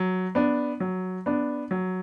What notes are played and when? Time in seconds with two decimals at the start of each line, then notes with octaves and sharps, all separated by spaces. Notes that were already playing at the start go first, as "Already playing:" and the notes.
Already playing: F#3
0.35 B3 D4
0.80 F#3
1.26 B3 D4
1.71 F#3